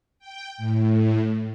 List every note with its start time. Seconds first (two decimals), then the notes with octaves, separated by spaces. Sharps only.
0.19 G5
0.57 A2